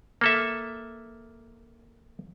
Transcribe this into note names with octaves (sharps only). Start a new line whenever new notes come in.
A#3 A4 E5